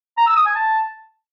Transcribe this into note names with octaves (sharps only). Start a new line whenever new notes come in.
A#5
E6
D#6
G#5
A5